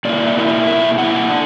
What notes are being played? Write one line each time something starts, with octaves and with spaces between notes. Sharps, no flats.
B2 A#3 E4 D5
B2 A#3 E4
B2 A#3 E4 E5
B2 A#3 E4 F#5
D4